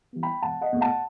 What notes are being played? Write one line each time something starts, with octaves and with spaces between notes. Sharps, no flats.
E3 G3 B3
G5 B5
E1 F#5 A5
D#5 F#5
E2 B2 A3
F#5 A5